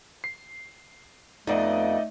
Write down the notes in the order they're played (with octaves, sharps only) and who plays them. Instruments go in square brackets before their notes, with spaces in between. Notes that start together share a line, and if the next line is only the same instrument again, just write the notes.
[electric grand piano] C7
[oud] F2 B3 [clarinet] A3 [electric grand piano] D#4 D5 D#5